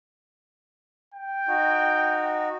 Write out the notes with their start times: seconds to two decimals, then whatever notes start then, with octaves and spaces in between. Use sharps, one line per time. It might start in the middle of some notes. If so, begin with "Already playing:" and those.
1.14 G5
1.48 D#4 F#4